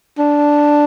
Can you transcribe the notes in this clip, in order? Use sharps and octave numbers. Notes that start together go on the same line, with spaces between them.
D4